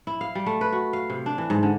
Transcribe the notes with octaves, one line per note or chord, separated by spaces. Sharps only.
E4
F5
G3
A3
B4
F#4
F5
C3
D4
E3
G#2
D3